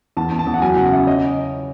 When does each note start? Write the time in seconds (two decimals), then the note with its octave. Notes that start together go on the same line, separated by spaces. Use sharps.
0.17 E2 A5
0.32 E2
0.39 A5
0.47 E2
0.54 F#5
0.62 F#3 G#5
0.77 C#3 F#5
0.92 C#3 E5
1.07 C#4 D#5
1.19 D#5